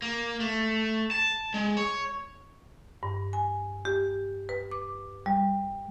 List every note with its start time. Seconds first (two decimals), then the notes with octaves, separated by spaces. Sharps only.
0.02 A#3
0.40 A3
1.11 A5
1.54 G#3
1.77 C#5
3.03 G2
3.33 G#5
3.85 G4
4.49 B4
4.71 D6
5.26 G3